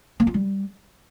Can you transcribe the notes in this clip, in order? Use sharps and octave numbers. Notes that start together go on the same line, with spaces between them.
A#3
F4
G3